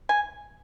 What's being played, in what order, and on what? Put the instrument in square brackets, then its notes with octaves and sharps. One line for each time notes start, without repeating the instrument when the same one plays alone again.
[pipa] G#5